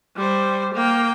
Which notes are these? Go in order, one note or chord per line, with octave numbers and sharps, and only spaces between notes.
G3 C5
A#3 G5